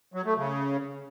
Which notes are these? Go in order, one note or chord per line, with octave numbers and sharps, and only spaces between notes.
F#3
A3
C#3